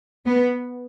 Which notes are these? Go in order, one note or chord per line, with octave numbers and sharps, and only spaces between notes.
B3